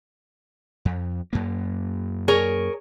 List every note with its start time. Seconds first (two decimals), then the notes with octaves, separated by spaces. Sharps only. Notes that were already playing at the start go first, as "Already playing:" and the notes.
0.85 F2
1.33 F#2 A#3
2.28 G#4 A#4 C#5